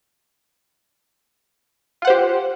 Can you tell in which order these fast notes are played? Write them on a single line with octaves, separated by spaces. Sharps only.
F4 F#5 C5 G4